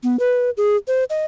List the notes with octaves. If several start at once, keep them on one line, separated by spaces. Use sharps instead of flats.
B3
B4
G#4
C5
D#5